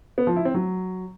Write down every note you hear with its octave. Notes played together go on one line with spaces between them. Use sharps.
B3
F3
E4
C4
F#3